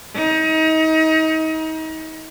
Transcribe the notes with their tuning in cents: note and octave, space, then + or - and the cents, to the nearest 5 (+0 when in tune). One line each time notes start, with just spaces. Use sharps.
D#4 +30